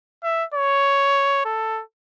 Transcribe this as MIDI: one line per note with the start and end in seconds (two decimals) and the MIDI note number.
0.24 0.44 76
0.54 1.40 73
1.45 1.82 69